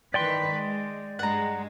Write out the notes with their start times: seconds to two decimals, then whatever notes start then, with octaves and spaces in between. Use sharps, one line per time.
0.14 D#3 E3 B4 D5 G5 C6
0.52 G#3
1.19 G2 G#3 F#5 A#5